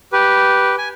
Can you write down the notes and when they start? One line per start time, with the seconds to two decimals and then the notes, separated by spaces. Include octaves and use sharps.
0.12 G4 B4
0.78 G#5